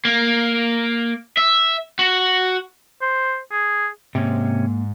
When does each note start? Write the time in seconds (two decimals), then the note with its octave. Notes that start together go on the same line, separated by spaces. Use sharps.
0.05 A#3
1.37 E5
1.99 F#4
3.02 C5
3.52 G#4
4.15 G#2 C3 A#3 C#4